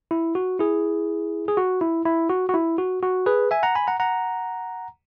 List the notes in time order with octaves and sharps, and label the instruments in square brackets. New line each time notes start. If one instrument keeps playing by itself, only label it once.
[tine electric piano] E4
F#4
E4 G#4
G#4
F#4
E4
E4
F#4
F#4
E4
F#4
F#4
G#4 B4
E5 G#5
F#5 A#5
G#5 B5
F#5 A#5
F#5 A#5